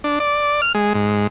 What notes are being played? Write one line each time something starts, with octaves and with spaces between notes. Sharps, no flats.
D4
D5
F6
G#3
G#2